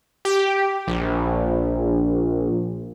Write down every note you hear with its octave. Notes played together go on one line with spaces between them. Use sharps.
G4
A#1